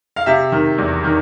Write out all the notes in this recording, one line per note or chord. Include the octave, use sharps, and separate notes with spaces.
F5
C3 E5
D#3
E2
D#3